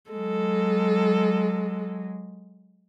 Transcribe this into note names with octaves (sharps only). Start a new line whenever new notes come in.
F#3 G#3 A4